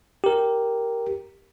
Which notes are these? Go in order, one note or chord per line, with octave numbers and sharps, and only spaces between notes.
G4 A#4